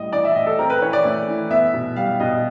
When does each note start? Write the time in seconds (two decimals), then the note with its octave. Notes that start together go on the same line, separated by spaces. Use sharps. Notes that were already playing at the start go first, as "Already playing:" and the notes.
Already playing: A2 G3 D#5
0.12 E3 D5
0.25 E5
0.35 A2 D#5
0.47 A4
0.59 C4 A#4
0.70 B4
0.82 E3 C#5
0.93 D5
1.05 A3
1.28 E3
1.50 B3 E5
1.73 B2
1.96 G3 F5
2.20 B2 D#5